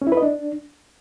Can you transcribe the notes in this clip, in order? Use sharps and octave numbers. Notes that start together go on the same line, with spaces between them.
C#4
E4
B4
D#5
D4